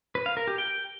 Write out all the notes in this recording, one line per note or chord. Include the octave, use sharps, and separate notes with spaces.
B4
F5
A#4
G4
G5